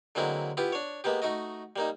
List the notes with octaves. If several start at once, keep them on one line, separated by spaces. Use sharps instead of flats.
D3 F#3 G#3 A#3 C4 E4
B3 E4 F4 G4
D4 C#5
G#3 A#3 B3 G4
A3 D#4 F#4 D#5
G3 A#3 D#4